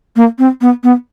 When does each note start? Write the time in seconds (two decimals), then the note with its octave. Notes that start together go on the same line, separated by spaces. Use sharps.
0.16 A#3
0.39 C4
0.61 B3
0.83 B3